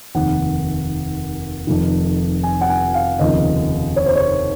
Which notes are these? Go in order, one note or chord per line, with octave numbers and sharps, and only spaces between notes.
F1 D#2 D#3 F#5
F1 F2 D#3
G#5
F#5
G#5
F5
F1 D#2 C#3 F3 D#5
C#5
C5
C#5